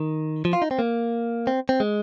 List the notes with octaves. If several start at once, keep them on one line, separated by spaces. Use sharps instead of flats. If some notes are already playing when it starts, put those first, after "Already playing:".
Already playing: D#3
F3
F4
D#4
C4
A#3
C4
C4
G#3